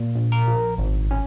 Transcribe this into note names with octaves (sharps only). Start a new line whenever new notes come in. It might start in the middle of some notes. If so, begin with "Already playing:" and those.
Already playing: A#2
A#1
A#4
A#1
G#1
C#4